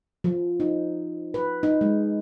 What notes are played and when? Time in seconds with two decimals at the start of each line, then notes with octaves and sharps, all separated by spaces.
0.24 F3
0.60 D#4
1.34 B4
1.63 D#4
1.81 G#3